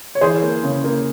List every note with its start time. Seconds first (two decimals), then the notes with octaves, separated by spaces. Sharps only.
0.15 C#5
0.21 E3 G#4 C5
0.42 A#3
0.63 C#3
0.84 A#3